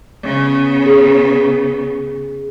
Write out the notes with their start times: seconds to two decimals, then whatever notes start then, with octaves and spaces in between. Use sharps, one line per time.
0.23 C#3 B3
0.86 G#4